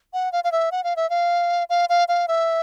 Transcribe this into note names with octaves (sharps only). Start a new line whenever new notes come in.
F#5
F5
F5
E5
F#5
F5
E5
F5
F5
F5
F5
E5